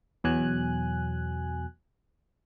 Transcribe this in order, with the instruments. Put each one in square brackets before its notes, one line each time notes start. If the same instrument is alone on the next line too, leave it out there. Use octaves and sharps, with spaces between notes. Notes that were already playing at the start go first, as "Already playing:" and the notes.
[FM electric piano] E2 B2 F#3 G#5 F#6